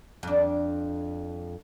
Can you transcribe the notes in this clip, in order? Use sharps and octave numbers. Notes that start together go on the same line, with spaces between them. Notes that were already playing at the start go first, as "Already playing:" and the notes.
F2 D4